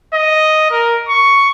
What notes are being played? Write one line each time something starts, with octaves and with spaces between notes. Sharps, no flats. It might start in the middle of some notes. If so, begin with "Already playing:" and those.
D#5
A#4
C#6